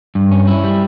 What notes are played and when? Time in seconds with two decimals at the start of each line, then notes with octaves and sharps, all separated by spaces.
0.15 G2
0.31 C#4
0.47 E4
0.64 G3